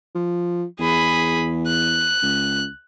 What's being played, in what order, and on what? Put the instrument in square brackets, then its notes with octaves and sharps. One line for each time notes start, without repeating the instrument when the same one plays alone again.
[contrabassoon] F3
[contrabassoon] E2 [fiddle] G#4 B5
[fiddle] F#6
[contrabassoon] C#2